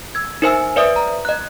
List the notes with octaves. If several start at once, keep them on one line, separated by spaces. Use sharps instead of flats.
E6 G#6
D#4 A#4 C5 E5 G#5 E6
B4 C5 D5 E5 D#6 D7
A#5
D#5 F#6